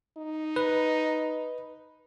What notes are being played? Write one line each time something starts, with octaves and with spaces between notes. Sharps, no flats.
D#4
B4